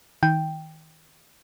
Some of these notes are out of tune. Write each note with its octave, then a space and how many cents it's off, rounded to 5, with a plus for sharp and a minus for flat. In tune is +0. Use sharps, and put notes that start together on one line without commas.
D#3 +30 G5 +0